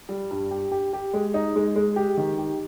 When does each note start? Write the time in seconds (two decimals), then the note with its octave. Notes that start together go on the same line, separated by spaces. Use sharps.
0.09 G3
0.31 G2
0.51 G4
0.71 G4
0.93 G4
1.14 G#3
1.34 D#4
1.56 G#3
1.76 G#3
1.96 G4
2.18 D#3
2.38 G4